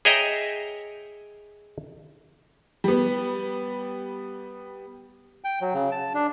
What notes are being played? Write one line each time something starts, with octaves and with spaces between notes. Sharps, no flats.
G#4 C#5 D#5 E5 G5 A#5
G3 B3
G5
F#3
C#3
A5
D4